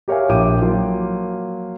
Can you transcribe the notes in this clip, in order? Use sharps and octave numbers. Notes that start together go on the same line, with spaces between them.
G4 A#4 C#5 E5 F5 G#5
A#1 F3 G4 G5 D6 D#7
F3 F#3 A#3 F4